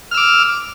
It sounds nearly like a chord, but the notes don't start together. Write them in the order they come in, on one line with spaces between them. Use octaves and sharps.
F6 E6 D6